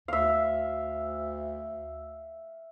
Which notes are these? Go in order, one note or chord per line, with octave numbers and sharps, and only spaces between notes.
D2 E5 F5